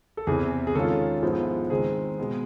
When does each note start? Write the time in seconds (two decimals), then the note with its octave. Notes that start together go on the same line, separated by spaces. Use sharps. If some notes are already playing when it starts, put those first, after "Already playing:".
0.17 A4
0.27 E2 C3 E3 G#4
0.67 G#4
0.75 D#3 G#3 C#4 F4 A4
1.23 G#2 F3 G#3 B3 E4
1.70 D#3 G#3 C4 G#4
2.18 B2 G#3 B3